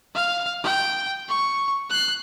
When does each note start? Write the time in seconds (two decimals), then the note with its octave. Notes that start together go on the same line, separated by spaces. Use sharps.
0.15 F5
0.63 G5
1.29 C#6
1.90 F#6 C7